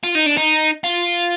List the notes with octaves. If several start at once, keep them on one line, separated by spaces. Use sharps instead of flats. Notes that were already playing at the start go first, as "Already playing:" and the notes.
F4
D#4
D4
D#4
F4